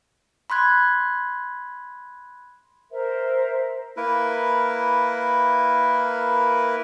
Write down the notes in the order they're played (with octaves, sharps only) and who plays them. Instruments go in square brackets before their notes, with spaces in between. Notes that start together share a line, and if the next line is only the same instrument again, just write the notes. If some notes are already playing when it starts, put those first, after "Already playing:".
[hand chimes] B5 C6 F#6 G#6
[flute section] A#4 C5 E5
[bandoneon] A#3 E4 A#4 B4